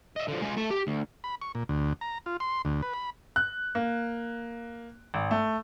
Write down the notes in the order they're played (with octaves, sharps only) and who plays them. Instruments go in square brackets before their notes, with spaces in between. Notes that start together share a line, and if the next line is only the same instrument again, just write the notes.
[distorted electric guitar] D#5 E5
D3 F3
G#3 F4
A3 A5
G4
D2
[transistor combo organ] B5
C#6
A#2
D2
A#5
F4
C6
D2
B4
B5
[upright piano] F#6
A#3
G#1
A3